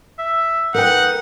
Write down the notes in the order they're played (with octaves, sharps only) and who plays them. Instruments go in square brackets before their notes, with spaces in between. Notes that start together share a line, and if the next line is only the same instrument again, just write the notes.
[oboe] E5
[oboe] D#4 [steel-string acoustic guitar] A#4 B4 G5 [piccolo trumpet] F#5